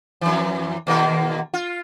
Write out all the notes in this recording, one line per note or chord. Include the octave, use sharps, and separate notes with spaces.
F2 E3
D#2 B2 A#3
F4